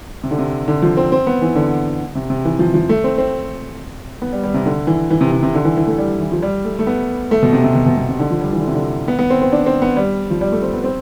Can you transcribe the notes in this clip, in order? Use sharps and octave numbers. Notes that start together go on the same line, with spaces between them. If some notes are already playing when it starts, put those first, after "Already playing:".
C3
D3
C3
D3
F3
C4
C4
B3
E3
D3
C3
C3
E3
F3
F3
A3
C4
C4
B3
G3
G3
C3
D3
E3
E3
C3
C3
C3
D3
E3
E3
A3
G3
E3
F3
G3
A3
A3
B3
A3
B2
C3
C3
B2
B2
B2
C3
D3
F3
G3
E3
D3
C3
D3
B3
B3
C4
C4
D4
C4
B3
G3
F3
G3
A3
C4
B3
C4